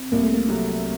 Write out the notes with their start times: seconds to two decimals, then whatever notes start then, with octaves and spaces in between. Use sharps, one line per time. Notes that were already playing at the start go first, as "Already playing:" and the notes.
Already playing: C4
0.12 C2 A#3
0.23 A3
0.34 A#3
0.49 C3 F#3 A3